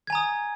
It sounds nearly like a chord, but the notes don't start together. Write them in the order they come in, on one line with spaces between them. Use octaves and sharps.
G#6 G#5 A#5 D#6